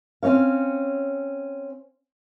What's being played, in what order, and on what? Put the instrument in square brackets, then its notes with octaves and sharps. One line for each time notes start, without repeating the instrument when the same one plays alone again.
[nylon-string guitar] C4 C#4 D#4 C#5 F5